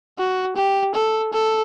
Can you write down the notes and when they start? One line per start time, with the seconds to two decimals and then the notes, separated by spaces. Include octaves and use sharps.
0.18 F#4
0.56 G4
0.95 A4
1.33 A4